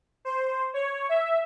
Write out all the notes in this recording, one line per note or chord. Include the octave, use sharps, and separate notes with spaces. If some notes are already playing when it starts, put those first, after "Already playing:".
C5
C#5
E5